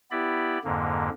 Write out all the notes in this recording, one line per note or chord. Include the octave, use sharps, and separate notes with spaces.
B3 E4 G4 D5 B5
F2 G#2 D3 A#3